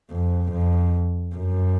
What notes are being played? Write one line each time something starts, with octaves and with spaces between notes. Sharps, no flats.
F2
F2
F#2